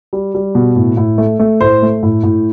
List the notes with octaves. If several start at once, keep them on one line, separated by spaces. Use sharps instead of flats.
G3
G3
B2
A2
A2
A3
A3
A2 C5
A3
A2
A2